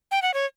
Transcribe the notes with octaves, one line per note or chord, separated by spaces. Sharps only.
G5
F#5
C#5